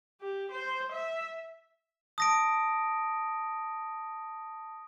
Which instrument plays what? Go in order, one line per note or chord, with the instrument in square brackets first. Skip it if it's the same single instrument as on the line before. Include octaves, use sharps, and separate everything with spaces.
[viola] G4
C5
E5
[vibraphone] A5 [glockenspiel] D#6 A#6 D7